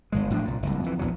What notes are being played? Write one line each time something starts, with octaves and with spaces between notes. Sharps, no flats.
G1 D#2 G#3
A2 F3 D4
C2 A#2
F#1 C2
F2 E3
A#1 E2 F#3